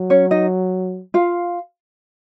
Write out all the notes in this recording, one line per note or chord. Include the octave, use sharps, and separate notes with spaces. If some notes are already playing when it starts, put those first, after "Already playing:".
Already playing: F#3
C#4 C#5
D#4 D#5
F4 F5